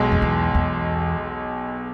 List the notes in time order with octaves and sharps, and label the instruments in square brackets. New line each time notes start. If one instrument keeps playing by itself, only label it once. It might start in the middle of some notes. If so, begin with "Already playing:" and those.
Already playing: [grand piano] B1 B2 G#3
[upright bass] F2
E2
E2